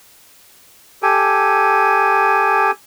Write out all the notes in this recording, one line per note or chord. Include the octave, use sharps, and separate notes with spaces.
G4 A4 G#5